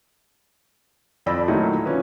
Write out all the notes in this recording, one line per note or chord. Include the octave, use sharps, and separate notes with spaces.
F2 F3 D5 B5 E6 A#6
A#2 D#3 F#3 A3 D#4 E4
D3 F3 C#4 B4